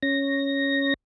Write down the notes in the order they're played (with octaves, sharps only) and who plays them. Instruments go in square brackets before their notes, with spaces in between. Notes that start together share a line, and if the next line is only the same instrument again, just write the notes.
[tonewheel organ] C#4 A#6